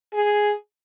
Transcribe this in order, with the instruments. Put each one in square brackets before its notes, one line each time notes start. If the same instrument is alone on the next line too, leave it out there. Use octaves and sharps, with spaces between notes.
[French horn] G#4